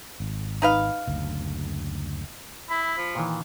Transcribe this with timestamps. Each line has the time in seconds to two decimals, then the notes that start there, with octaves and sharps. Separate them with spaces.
0.20 G#1
0.62 D#4 B4 F5
1.07 F#1 D2
2.70 E4 B5
2.98 F3
3.15 A#2 D#3 E3